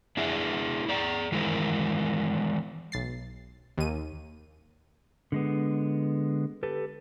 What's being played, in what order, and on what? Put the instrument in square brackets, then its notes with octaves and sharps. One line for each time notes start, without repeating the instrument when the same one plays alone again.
[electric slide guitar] D4 E4 G#4 D5 E5
G#4 D5 A#5
D#3 E3 G#3 A#4 C5
[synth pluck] B1 A6 C7
D#2 D#7
[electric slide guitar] D3 G#3 B3
G4 A4 B4